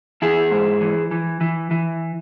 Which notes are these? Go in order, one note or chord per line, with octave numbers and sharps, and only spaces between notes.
E3 E4 G#4
G#2
E3
E3
E3
E3